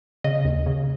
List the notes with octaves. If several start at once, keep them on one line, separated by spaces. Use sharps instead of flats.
C#3 D#5
D#2
C#3